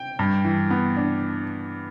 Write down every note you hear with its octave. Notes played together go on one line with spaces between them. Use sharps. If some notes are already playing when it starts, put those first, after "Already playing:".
Already playing: G5
G2
E3
B3
D4